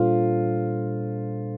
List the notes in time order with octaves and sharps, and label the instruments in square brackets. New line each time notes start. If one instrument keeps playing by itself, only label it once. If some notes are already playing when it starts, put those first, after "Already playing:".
Already playing: [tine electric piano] A#2 G3 D4 A4 C5 [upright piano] F4